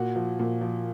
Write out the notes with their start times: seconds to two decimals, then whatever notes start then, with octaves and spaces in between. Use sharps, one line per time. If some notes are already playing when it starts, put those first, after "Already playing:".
Already playing: A#2 F#4
0.16 F3
0.39 A#2
0.61 F3